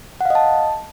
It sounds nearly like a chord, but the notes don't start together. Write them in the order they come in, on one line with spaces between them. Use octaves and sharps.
F#5 F5 D#5 A5